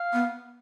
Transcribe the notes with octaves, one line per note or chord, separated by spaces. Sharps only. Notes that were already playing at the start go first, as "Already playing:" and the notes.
Already playing: F5
B3